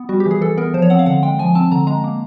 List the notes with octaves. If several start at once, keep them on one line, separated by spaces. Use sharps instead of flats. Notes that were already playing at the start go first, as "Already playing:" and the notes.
Already playing: B3
G3 F#4
G4
E3 G#4
E3 A4
B3 A#4
F3 C5
C#5
C4 F#5
F5
D3 F#5
G#3 G5
F3 G#5
C4 A5
D3 A#5
G#3 A#5
A#3